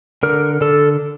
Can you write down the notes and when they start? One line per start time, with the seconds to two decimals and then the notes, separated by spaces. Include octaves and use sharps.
0.23 D3 A#4
0.61 D3 A4